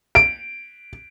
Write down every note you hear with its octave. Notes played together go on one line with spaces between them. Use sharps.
D7